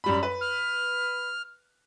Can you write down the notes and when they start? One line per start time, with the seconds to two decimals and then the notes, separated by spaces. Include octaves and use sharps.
0.04 F#2 G3 B5
0.23 B4
0.41 F6